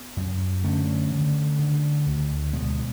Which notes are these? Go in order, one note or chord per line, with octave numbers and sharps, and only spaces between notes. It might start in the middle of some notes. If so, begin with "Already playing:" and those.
Already playing: B3
F#2
D3 A3 C#4
D3
D3
D2
B2 G#3 B3